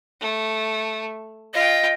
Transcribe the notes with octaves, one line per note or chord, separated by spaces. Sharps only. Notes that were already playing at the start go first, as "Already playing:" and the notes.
A3
F4 D#5 G5